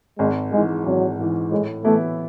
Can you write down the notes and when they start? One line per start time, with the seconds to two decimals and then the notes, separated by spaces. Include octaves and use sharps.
0.19 G#1 G#3
0.52 G#2 E3 G#3
0.85 G#1 F#3
1.19 G#2 E3
1.52 A2 G#3
1.85 E3 A3 B3 E4